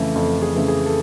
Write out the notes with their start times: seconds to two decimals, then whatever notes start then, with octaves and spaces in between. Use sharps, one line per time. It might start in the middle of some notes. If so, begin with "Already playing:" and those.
Already playing: F2 C#3 E3 A3
0.16 F2 A4
0.42 G#4
0.55 C#3 E3 A3
0.68 G#4
0.86 A4